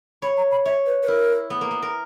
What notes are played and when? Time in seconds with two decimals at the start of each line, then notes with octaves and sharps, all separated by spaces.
0.22 C#5 B5
0.37 A#5
0.51 B5
0.66 C#5 E5
0.86 B4
1.03 B4
1.07 E4 A#4
1.50 B3
1.61 A#3
1.71 B3
1.82 A#4